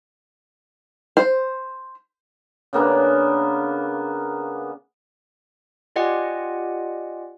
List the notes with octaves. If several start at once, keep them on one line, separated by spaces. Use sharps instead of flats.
C5
C#3 A#3 B3 D4
F4 G4 D5 D#5 F#5 G#5